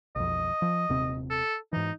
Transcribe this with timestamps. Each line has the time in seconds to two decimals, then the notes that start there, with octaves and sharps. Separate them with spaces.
0.16 B1 F2 D#5
0.62 F3
0.89 D#1 C3 C4
1.30 A4
1.73 G#2 E3 D#4